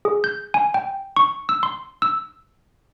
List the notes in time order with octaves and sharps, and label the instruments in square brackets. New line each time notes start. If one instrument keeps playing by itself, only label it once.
[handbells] G#4
G6
G#5
G5
C#6
E6
C6
E6